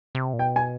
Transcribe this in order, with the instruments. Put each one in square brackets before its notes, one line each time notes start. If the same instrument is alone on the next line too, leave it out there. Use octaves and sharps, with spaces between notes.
[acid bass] C3
A#2
[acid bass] B2 [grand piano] G5
[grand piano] G#5